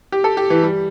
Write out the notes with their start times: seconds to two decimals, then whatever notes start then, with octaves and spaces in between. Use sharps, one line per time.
0.12 G4
0.24 A4
0.37 G4
0.50 E3
0.63 G3